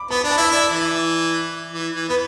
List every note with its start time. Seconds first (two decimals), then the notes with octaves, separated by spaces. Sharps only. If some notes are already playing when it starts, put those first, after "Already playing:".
Already playing: B5 D6
0.11 B3 B5
0.21 D4 B5
0.31 A5
0.37 E4 E5
0.51 E4 D5
0.72 E3
1.73 E3
1.94 E3
2.09 B3 B4